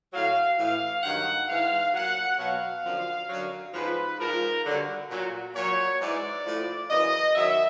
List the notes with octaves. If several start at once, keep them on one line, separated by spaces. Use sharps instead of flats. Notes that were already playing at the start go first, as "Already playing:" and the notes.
A2 F#3 F5
A2 E3 F5
G2 D#3 F#3 F#5
G#2 E3 F5
A#2 F#3 F#5
B2 F#3 F5
F#2 D3 F3
F#2 D3 F#3
G#2 F3 B4
G#2 F3 A#4
G2 D3 F#3
A#2 F#3
A#2 F#3 C#5
G#2 E3 D5
A2 F3
F#2 C#3 E3 D#5
F#2 D#3 F#3 E5